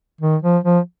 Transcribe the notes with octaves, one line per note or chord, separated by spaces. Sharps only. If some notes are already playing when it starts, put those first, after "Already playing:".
D#3
F3
F3